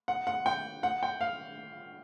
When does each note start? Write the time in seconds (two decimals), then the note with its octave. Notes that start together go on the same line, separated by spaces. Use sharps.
0.08 F#5
0.27 F#5
0.46 G5
0.83 F#5
1.03 G5
1.21 F5